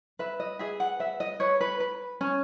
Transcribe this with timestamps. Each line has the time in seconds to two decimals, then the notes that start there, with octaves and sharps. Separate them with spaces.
0.19 B4 E5
0.40 D#5
0.59 G#4 E5
0.80 F#5
0.99 B4 E5
1.20 D#5
1.40 B4 C#5
1.61 B4
1.80 B4
2.21 C#4